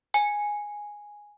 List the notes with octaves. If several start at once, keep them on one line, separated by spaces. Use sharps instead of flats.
G#5